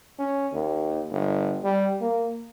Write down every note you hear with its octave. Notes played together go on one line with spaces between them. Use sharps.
C#4
D#2
G1
G3
A#3